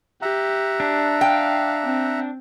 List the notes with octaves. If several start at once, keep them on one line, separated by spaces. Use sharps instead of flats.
G4 E5 F#5 A#5
D4
F5 G5
C4